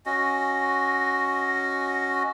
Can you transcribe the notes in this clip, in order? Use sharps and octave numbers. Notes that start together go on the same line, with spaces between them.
C#4 F#4 D#5